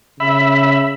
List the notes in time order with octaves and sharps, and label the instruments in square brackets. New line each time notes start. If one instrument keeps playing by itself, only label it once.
[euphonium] C#3 [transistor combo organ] E5 B5